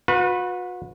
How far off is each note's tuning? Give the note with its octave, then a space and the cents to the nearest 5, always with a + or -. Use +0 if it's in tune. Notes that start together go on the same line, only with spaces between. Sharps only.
F#4 -40 B4 +0